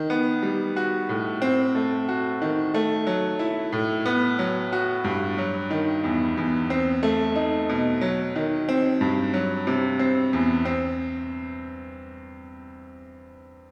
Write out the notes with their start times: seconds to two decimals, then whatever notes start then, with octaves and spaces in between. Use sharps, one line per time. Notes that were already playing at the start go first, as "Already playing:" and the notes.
Already playing: D#3
0.10 B3
0.43 G3
0.76 F#4
1.09 A2
1.42 C4
1.75 A3
2.08 F#4
2.42 D#3
2.74 A3
3.07 F#3
3.39 E4
3.73 A2
4.06 B3
4.39 F#3
4.72 F#4
5.04 G2
5.38 F#3
5.71 D#3
6.04 E2
6.37 E2
6.70 C4
7.03 A3
7.36 D#4
7.69 B2
8.01 F#3
8.36 D#3
8.69 C4
9.01 G2
9.34 F#3
9.67 C3
9.99 C4
10.33 E2
10.65 C4